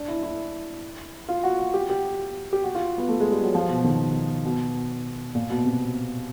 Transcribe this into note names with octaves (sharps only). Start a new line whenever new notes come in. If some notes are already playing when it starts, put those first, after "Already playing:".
Already playing: D4
E4
E4
F4
F#4
F#4
G4
G4
G4
F#4
F4
B3
A3
G#3
G3
F#3
F3
B2
D#3
B2
A#2
B2
C3